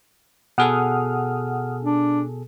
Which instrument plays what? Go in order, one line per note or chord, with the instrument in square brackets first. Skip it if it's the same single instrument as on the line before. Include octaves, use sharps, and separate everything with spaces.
[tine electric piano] B2 G#4 A4 [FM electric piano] F#5 D#6 F6
[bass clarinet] D4